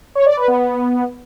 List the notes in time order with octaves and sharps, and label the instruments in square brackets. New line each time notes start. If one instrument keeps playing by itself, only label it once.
[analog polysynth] C#5
D5
B4
B3